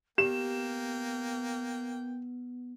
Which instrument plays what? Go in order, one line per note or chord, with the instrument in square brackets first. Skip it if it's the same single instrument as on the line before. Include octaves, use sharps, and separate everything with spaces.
[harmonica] A#3 G5 [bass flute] B3 [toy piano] G4 [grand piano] E7